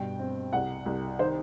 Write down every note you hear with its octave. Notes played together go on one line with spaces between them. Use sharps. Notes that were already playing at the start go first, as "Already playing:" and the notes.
Already playing: G2 B2 G5
C4
C2 F#5
C2
D#3 C5